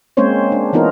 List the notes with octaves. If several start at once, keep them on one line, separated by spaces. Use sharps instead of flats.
G#3 A#3 C4 C#4 C5 C#5
D4
E3 B3 D#4 F4 A#4